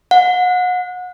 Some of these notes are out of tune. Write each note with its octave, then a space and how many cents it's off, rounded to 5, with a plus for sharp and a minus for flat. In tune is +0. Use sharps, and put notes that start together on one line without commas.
F#5 -30